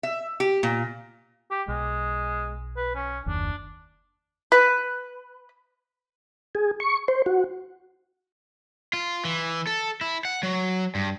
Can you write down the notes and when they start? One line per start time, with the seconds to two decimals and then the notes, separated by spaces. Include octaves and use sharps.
0.03 E5
0.40 G4
0.63 A#2
1.51 G4
1.68 B1 G#3
2.76 B4
2.95 C#4
3.26 F#1 D#2 D4
4.52 B4
6.55 G#4
6.80 C#6
7.08 C5
7.26 F#4
8.93 F4
9.25 E3
9.67 A4
10.01 E4
10.25 F#5
10.43 F#3
10.95 G2